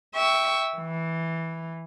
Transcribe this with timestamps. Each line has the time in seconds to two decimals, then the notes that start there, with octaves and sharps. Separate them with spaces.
0.15 E5 G5 C#6
0.77 E3